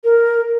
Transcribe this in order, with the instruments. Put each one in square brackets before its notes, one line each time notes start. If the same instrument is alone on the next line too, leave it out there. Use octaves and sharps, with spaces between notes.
[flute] A#4